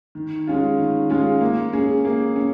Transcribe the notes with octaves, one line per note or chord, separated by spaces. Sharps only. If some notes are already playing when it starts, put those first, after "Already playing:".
D#3
G#3 C#4 F4
D#3
G#3 C#4 F4
A#3
C#4 G#4
A#3
C#4